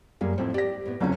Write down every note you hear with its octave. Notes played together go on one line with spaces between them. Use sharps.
F#2 G3 A#3 G#4
F2 A2 C4
G4 D5 A#6
A2 B3
F#1 F2 C#3 F#3 C#4